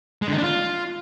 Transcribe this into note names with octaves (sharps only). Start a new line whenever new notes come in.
G#3
D3
D#4
D4
F4